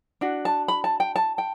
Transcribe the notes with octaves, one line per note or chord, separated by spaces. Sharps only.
D4 F#4
A5
B5
A5
G5
A5
G5